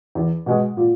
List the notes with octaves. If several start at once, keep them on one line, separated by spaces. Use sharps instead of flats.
E2
B2 G#3
A#2